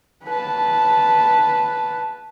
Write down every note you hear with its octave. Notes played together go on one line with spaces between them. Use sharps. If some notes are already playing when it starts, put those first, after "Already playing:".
B4 A5